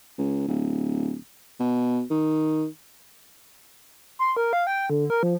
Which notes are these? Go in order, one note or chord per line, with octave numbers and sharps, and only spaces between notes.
C#2
D1
B2
D#3
C6
A#4
F5
G5
D3
A#4
F3